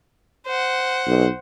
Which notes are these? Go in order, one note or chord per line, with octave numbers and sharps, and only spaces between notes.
C5 F#5
B1